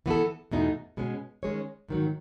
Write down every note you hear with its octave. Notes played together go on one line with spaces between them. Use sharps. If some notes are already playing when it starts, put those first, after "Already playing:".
E3 B3 F#4 A4
E2 B2 A3 D#4
B2 G#3 C#4
D#3 G#3 C#4 G#4 C#5
G#2 D#3 F#3